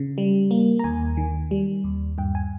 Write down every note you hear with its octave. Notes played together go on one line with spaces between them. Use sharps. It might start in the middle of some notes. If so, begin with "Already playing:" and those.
Already playing: C#3
G3
A#3
A#5
D#2 G#5
D#3
G3
D#2
G2 G5
G#5